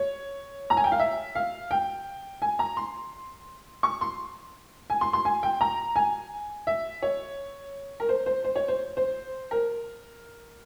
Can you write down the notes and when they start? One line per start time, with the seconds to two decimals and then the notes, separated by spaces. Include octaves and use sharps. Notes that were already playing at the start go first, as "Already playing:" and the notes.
Already playing: C#5
0.70 A#5
0.77 G#5
0.84 G5
0.92 F5
0.99 E5
1.35 F5
1.71 G5
2.42 G#5
2.59 A#5
2.77 C6
3.83 C#6
4.01 C6
4.90 G#5
5.01 C6
5.13 C6
5.25 G#5
5.43 G5
5.61 A#5
5.96 G#5
6.67 E5
7.02 C#5
8.00 A#4
8.09 C5
8.26 C5
8.44 C5
8.56 C#5
8.68 C5
8.97 C5
9.51 A#4